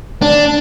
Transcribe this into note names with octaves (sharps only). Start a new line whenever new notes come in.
D4